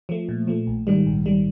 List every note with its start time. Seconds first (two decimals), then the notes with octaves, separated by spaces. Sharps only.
0.09 F3 A3
0.29 A#2
0.47 F3 A3
0.67 A#1
0.87 G#2 D#3 G3
1.06 A#1
1.26 D#3 G3